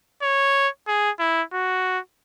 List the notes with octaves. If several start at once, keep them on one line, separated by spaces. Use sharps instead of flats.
C#5
G#4
E4
F#4